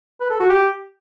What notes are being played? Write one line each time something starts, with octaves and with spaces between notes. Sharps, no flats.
B4
A4
F#4
G4